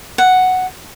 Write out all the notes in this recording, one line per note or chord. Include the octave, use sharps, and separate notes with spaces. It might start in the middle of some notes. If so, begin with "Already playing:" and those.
F#5